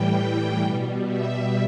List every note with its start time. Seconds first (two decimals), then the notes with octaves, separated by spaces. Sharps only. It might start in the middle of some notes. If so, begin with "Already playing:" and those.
Already playing: A2 E3 G3 G5
0.16 G5
0.61 B2 G3
1.06 E5